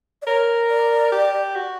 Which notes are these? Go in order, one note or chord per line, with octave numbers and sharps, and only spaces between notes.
D5
A#4 C#5
D5
G4
F#4